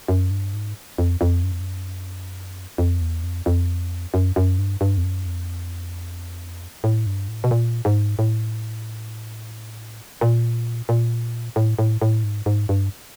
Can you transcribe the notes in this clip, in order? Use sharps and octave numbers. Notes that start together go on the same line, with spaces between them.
F#2
G2
G#2
F2
F2
F#2
F2
F#2
F2
E2
F2
F2
F#2
F#2
G2
G2
F2
F#2
F2
A2
G2
A2
B2
A#2
G#2
A2
A#2
A#2
A2
A2
A2
G#2
G#2
G2